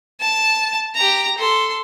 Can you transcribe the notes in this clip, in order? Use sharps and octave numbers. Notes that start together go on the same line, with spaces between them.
A5
G4 A#5
A4 C6